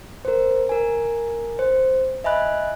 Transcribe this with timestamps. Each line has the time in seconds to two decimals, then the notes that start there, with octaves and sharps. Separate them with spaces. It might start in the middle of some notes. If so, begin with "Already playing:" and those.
0.25 A#4 C5
0.69 A#4 G#5
1.59 C5
2.24 D#5 E5 G#5 B5 F#6